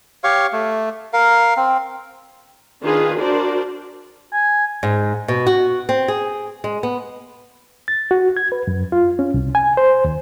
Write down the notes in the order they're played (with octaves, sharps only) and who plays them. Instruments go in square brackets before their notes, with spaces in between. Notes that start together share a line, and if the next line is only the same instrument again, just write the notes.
[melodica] G4 C#5 F5 C#6
A3
A#4 F5
C4
[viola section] D#3 D4 F4 G#4 B4
D4 F#4 A#4 C5 D5
[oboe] G#5
[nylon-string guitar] G#2
B2
F#4
C4
G#4
G#3
B3
[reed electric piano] A6
F#4
G#6
B4
F#2
F4
C#4
C2
G#5
C5
D#2